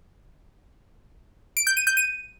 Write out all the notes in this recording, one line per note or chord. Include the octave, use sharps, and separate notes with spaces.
D7
G6
D#7
G6
D#7